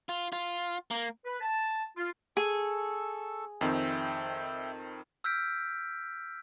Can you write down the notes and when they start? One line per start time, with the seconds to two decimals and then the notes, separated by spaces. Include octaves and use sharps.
0.09 F4
0.33 F4
0.91 A#3
1.25 B4
1.41 A5
1.97 F4
2.37 G#4 A4 C#6 E6
3.61 F2 D#3 C4 E5 G5
5.24 E6 F6 G6 B6 D7